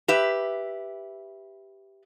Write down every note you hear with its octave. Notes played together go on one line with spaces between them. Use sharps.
G4 B4 E5